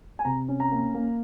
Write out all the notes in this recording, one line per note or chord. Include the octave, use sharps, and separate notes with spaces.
G#5
C3 A#5
C#4
A#5
A#3
A#3